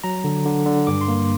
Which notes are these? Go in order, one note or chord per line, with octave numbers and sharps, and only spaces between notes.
F#3 A#5
D3
D3
D3
G2 D6
C6
A#3